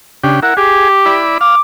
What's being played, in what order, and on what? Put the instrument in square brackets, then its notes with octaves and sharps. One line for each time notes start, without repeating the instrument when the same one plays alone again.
[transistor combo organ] C#3 D4 G4
[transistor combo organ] E4 A#4 [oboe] F#5
[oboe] G4 [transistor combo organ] G#4
[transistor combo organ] E4 D5 B5
[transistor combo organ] F5 [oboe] D6